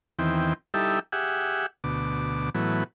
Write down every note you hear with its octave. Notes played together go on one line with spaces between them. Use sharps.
E2 D#3 E3 C4 G5
G3 D#4 E4 G4 A4 E5
G4 G#4 E5 F#5
D2 B2 D6
A2 E3 F#3 B3